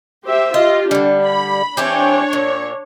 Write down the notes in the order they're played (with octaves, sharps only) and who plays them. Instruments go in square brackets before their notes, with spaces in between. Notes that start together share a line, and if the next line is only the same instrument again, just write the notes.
[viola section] G4 C5 E5
[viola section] F4 G4 [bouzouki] D#5
[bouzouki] D3 G3 [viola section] D4
[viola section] B5
[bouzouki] E3 C4 G4 [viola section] D4 C#5
[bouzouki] A#2